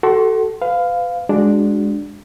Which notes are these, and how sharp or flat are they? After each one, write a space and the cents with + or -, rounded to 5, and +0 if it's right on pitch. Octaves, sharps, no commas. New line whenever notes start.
F#4 +35 A4 +0 C6 +15
B4 +35 F5 +0
G#3 +0 D4 +0 F#4 +0